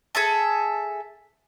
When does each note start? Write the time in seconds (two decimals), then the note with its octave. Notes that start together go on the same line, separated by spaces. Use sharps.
0.15 G#4 A4 E5 A5